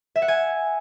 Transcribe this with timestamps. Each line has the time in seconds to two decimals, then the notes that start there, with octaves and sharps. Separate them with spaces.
0.16 E5
0.22 F#5
0.28 G#5